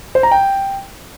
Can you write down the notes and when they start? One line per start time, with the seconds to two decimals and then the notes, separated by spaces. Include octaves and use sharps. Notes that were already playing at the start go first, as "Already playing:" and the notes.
0.15 C5
0.23 A#5
0.31 G5